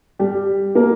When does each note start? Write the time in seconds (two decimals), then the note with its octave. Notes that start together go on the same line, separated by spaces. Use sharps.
0.19 G3 G4
0.75 A#3 A#4